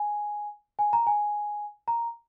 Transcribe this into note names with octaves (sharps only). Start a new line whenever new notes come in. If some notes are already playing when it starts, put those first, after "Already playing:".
Already playing: G#5
G#5
A#5
G#5
A#5